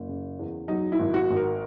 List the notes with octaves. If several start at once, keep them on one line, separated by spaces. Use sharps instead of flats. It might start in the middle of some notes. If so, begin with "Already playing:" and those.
Already playing: F#1
C#3
E2
F#3 D#4
E4
G#1
F#4
G#1
A#4